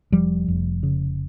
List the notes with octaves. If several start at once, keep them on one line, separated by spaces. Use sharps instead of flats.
F1 F3 G3
F1
C#3